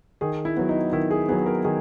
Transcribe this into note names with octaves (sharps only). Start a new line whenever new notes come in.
D#3 G#4
E4
F#3 B3
D#4
D#3 E4
G#4
F#3 B3 G#4
A#4
D#3 G#4